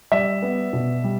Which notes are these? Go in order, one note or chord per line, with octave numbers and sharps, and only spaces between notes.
G3 D5 E5
B3
B2
G3